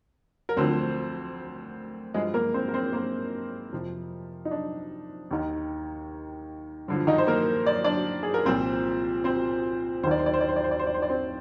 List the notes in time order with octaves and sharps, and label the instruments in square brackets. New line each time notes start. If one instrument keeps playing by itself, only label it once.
[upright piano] A#4
D2 D3 F3 C4 C5
G2 F3 G#3 G#4
A#3 A#4
C4 C5
A#4
C4 C5
A#3 A#4
F2 C3 F3
D#4
D4
D#2 D#3
G2 D3 F3
D#3 D#4
C5
A#3 A#4
D5
D4 D5
G#4
A#4
C2 A#2 F3 C4 C5
C4 C5
D#2 C5
D#3 D5
C5
D5
C5
D5
C5
D5
C5
D5
C5
D5
C5
D5
C4 C5